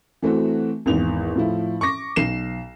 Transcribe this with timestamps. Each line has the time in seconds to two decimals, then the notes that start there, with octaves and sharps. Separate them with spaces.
0.22 E3 A3 C4 F#4
0.86 G#1 E2 F7
1.35 A2 F3 E4
1.81 C#6 D6 A#6
2.16 B1 C7 E7